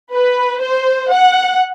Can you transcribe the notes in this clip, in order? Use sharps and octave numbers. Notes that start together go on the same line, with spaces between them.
B4
C5
F#5